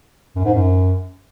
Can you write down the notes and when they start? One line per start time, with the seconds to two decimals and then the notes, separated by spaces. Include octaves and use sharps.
0.36 F#2
0.45 G#2
0.54 F#2